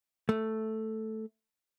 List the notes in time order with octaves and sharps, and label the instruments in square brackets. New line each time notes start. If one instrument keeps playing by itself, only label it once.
[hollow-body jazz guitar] A3